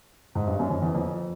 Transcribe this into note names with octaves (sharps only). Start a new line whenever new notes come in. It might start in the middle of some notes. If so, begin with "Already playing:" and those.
G#2
G2
F#2
F2
E2
F2